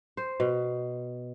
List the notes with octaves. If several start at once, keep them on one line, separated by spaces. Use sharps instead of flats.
C5
B2